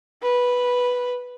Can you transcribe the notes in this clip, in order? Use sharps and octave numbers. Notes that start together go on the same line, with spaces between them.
B4